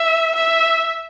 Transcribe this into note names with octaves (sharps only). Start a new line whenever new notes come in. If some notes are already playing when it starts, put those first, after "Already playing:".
Already playing: E5
E5